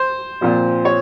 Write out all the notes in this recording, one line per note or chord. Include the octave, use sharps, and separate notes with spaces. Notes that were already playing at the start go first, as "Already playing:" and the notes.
Already playing: C5
A#2 F3 C4
C#5